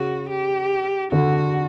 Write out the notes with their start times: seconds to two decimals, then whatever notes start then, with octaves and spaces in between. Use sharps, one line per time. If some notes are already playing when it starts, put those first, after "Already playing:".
Already playing: C#3 F#4
0.29 G4
1.12 D3 F#4